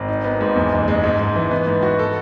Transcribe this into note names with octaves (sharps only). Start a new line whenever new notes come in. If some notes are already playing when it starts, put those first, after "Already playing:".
Already playing: G#1
D#4
B3
G#2
E2
F#1
G#3
G#2
G#2
E3
B3
G#2
F#4
A4